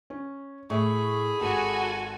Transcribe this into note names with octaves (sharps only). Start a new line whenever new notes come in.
C#4
A2 G#4 E5 B5 C#6
G#1 F#4 G4 A4 G#5